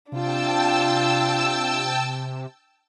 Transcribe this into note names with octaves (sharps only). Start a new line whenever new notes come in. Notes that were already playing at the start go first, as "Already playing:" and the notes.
C3 D4 F4 G5 A5 E6